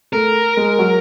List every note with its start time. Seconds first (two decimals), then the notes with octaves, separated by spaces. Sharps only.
0.13 A3 A#4
0.57 G#3
0.79 F#3